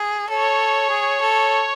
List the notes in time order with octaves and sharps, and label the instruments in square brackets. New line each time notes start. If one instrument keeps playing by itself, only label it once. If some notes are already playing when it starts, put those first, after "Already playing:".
Already playing: [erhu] G#4
[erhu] A4 [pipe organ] C#5
[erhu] G#4
A4